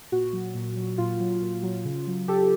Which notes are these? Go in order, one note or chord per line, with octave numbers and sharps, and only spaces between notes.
A#2 F#4
F#3
A#2
F#3
A#2 F4
F#3
A#2
F#3
C#3
F#3
C#3 G4 A4